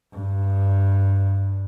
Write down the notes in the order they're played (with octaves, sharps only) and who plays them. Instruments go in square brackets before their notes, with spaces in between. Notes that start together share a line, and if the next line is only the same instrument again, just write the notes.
[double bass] G2